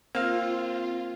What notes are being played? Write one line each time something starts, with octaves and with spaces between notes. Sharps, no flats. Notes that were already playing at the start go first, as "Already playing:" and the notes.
A#3 C4 F4 F5